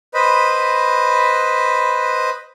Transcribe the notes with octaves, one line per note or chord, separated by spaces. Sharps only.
B4 C5 D#5 B5